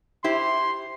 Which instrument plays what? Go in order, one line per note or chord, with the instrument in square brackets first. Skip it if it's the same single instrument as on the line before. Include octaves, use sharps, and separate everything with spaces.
[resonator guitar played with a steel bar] E4 G4 C5 [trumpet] C6